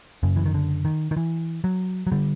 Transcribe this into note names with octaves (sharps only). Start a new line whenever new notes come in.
F#2 C#3
E3
D#3
D3
D#3
D#3
E3
F#3
F#3
D3 G3